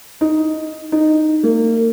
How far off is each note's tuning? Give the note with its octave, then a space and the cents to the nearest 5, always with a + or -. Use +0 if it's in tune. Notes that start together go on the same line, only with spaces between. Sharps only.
D#4 +5
D#4 -10
A#3 -30